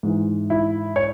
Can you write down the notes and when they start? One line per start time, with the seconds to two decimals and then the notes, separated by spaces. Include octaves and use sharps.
0.03 G#2 E3
0.50 E4
0.96 C#5